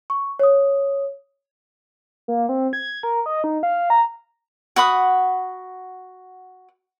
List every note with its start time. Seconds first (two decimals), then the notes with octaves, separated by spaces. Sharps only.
0.10 C#6
0.39 C#5 D#6
2.28 A#3
2.49 C4
2.73 G#6
3.03 A#4
3.26 D#5
3.44 D#4
3.63 F5
3.90 A#5
4.76 F#4 F#5 B5 D#6